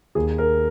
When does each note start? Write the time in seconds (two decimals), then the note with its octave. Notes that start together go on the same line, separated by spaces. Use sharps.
0.15 D#2 G#4
0.38 A#4